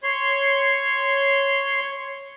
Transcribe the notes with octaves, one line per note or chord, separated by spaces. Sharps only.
C#5 C6